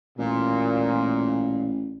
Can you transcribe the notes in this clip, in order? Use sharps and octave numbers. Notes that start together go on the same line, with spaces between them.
A1 A#2